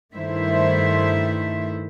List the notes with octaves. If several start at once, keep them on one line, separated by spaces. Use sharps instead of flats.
G2 D#3 A3 E4 C5 E5